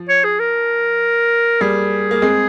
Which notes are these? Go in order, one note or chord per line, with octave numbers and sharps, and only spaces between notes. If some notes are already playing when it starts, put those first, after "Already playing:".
Already playing: F3
C#5
G#4
A#4
G3 A#3 G#4
A#3
G#3 C4